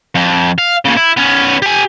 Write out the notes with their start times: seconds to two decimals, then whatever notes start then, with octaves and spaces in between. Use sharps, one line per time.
0.15 F2
0.58 F5
0.85 A#2 C#3
0.97 E4
1.17 B3 C#4
1.62 G4 G#5